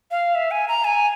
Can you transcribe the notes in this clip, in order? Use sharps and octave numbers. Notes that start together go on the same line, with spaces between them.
F5
E5
G#5
A#5
G#5